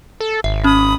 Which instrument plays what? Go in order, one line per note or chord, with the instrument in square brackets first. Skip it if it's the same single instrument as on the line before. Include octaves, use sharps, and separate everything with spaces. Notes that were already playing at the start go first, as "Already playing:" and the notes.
[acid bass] A4
[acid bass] G#1 [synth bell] E5
[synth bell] C#4 [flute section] B5 D#6